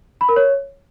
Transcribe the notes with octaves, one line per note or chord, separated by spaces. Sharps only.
B5
A#4
C#5